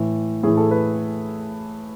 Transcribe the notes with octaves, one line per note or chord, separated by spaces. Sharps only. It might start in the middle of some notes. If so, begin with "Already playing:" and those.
Already playing: A2 E3
A2 E3 G#4
A4
B4